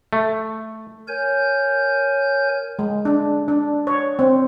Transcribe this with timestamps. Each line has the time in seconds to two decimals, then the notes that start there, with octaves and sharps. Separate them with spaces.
0.13 A3
1.08 A#4 C#5 G#5 G6
2.79 G#3
3.05 D4
3.48 D4
3.87 C#5
4.19 C4